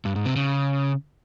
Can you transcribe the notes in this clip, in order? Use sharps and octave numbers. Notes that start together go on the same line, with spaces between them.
G2
G#2
C3
C#3